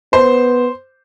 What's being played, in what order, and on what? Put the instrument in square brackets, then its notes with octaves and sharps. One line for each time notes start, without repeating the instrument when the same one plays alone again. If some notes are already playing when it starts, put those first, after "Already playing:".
[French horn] B3 [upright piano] C5